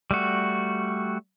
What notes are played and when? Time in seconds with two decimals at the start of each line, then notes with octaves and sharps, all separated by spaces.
0.11 G3 A3 F#4